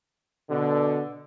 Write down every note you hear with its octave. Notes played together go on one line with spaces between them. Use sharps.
B2 D3